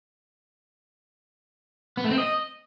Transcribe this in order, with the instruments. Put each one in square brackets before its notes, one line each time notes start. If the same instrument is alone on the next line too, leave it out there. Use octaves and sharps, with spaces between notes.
[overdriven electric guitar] B3
A3
C4
D#5